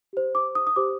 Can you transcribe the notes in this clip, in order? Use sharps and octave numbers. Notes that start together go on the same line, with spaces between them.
G4 C5
D6
D#6
D#6
G4 C5 D6